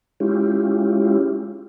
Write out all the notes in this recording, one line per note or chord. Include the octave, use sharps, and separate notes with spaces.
G#3 C#4 E4 F4 G4